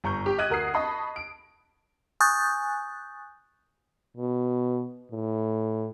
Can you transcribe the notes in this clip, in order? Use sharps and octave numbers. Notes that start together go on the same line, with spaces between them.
G1 A#5 C#6 G6
G4
D#5 F#6 G#6 D#7
D2 A#4 D#6 C7
D#5 A5 B5 C#6 D#6
D7
G#5 C#6 D#6 F#6 G6 A6
B2
A2